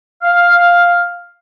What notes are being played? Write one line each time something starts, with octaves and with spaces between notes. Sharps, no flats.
F5